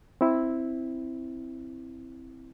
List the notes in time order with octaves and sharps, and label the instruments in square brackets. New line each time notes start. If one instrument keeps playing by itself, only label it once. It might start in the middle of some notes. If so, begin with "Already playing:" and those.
[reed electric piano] C4 E4